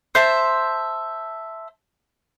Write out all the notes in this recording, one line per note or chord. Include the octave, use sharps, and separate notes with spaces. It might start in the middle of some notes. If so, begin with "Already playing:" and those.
C5 E5 A5